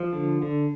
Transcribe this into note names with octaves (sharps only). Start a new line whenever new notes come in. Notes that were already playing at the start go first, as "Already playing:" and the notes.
Already playing: F3
D3
D3